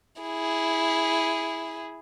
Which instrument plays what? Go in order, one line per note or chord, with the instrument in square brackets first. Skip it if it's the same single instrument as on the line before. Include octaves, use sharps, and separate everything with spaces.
[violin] E4 G#4